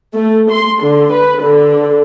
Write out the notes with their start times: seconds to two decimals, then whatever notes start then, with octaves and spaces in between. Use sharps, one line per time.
0.14 A3
0.51 C6
0.82 D3
1.13 B4
1.42 D3